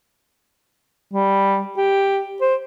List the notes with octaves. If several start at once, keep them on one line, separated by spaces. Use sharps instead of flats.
G3
G4
C5